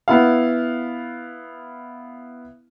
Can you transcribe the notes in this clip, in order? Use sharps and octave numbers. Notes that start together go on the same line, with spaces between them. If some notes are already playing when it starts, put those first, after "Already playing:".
B3 E4 F5